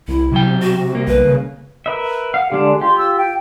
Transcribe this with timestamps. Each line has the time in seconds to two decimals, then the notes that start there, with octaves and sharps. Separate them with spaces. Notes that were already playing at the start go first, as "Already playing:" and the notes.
0.08 C2 E4
0.32 B1 C3 F#3 G5
0.62 F#4
0.92 C2 A#3
1.08 B1 B4
1.25 C#3
1.86 A#4 B4 E5
2.34 F5 F#5
2.52 D3 G#3 D4 G4
2.81 F4 G4 C6
2.98 E6
3.17 G5